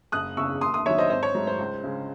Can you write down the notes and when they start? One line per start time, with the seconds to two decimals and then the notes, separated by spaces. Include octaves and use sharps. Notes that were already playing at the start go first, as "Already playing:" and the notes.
0.12 F#1 D#6 F#6
0.37 E2 C#3 C#6 E6
0.61 D#2 C6 D#6
0.74 C6 D#6
0.86 D#3 F#3 C#5 E5
0.98 C5 D#5
1.10 G#1 C5 D#5
1.23 C#5
1.34 G#2 F#3 A3
1.47 C5
1.59 C#2
1.84 C#3 G#3